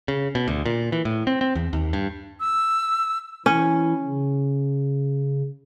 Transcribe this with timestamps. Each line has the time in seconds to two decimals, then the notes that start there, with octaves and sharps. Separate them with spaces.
0.08 C#3
0.35 B2
0.48 D2
0.66 A#2
0.92 E3
1.05 A2
1.27 C4
1.41 C4
1.55 E2
1.73 D#2
1.93 G2
2.40 E6
3.46 E3 C#4 E4
4.04 C#3